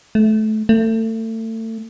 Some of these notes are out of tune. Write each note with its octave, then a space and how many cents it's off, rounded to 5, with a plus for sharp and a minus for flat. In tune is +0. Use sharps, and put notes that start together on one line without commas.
A3 -25
A3 +30